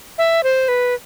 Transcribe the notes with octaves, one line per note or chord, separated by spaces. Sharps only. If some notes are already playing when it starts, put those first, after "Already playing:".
E5
C5
B4